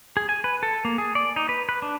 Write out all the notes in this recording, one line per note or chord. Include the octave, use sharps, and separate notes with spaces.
G#4
G#5
B4
A4
A#3
G#4
D5
D#4
B4
B4
D4